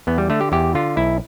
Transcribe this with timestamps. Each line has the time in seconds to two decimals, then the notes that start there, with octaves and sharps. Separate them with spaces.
0.07 E2 B3
0.18 G3
0.30 D3 A3
0.41 G4
0.52 E2 G4
0.75 D3 F4
0.97 B1 E4